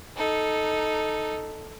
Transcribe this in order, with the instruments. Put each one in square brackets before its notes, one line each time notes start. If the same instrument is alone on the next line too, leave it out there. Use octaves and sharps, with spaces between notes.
[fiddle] D#4 A4